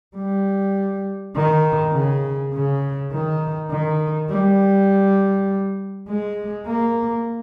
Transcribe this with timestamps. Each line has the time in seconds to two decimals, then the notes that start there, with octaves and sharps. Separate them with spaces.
0.16 G3
1.35 D#3
1.93 C#3
2.54 C#3
3.12 D#3
3.71 D#3
4.30 G3
6.08 G#3
6.66 A#3